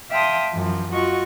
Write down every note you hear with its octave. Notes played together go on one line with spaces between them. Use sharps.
E5 F5 G5 A5 C6 D#6
F#2 E3 F3
F4 F#4 D#5 C#6